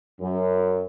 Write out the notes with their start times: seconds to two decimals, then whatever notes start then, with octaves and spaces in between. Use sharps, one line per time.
0.20 F#2